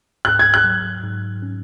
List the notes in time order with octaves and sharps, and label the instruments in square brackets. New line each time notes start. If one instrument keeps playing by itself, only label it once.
[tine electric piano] G#2 [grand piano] F#6
[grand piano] G#6
F#6
[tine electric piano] F#3
G#2
C#4